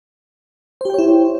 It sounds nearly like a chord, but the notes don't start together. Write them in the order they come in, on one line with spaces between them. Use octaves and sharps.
C5 G4 G5 C#5 E4